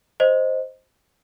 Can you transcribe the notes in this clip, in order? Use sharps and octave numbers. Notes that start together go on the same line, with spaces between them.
C5 D#5